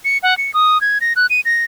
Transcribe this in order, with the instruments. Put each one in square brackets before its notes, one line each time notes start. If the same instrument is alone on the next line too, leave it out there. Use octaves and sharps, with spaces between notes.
[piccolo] C#7
F#5
C#7
D#6
G#6
A#6
F#6
D#7
A#6